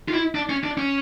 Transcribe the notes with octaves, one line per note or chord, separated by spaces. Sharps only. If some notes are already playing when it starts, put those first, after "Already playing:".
F4
E4
D4
C#4
D4
C#4